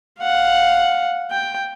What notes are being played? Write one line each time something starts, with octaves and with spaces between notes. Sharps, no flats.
F5 F#5
G5